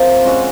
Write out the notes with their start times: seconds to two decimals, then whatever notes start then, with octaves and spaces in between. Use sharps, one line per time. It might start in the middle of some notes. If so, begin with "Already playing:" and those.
Already playing: C3 F3 A#3
0.23 G#3 C#4 F#4